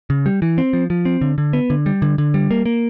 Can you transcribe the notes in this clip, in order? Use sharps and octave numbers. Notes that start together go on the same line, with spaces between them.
C#3
G3
E3
C4
F3
F3
C4
D3
D3
B3
D3
G3
D3
D3
G3
A#3
A#3